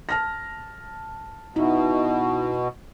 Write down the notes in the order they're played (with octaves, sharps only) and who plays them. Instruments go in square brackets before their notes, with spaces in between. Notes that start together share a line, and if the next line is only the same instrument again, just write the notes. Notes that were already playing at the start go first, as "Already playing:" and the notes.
[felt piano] A5 F6 A#6
[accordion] B2 [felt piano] D#4 E4